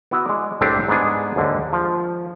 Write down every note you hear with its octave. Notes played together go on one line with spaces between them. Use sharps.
B3 E4 F#4 E5
G#3 D5
C2 A2 C4 D4 G4 A4
G#2 B3 D4 G#4
D#2 G#2 D3
F3